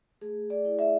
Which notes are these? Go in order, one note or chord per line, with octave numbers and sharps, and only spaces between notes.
A3 G#4
D5
E4
E5